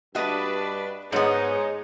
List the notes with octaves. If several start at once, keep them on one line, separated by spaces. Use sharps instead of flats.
G2 D4 F#4 B4 D#5
G#2 G#3 B3 D#4 G#4 C#5